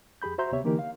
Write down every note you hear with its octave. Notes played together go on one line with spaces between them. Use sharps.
F2 G4 G#4 B5 G6
F#4 C5 E5 A#5 C6 G6
D2 C3 B3 G4 C#5 E5
D3 E3 A#3 D#4 G4 A#4
F5